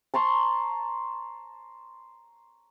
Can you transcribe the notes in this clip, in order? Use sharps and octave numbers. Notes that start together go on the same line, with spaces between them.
A5 A#5 C6 C#6